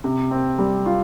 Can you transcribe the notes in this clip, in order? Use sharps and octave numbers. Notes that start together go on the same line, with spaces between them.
C3
C4
G3
F4